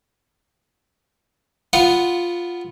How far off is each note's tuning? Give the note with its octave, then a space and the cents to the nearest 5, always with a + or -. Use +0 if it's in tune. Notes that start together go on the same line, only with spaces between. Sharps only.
B3 +0 F4 +0 F#5 +0